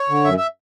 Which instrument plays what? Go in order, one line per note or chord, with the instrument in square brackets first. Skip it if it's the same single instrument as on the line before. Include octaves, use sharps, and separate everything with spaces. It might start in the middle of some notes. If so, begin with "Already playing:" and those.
Already playing: [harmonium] C#5
D3
F#2 E5
E5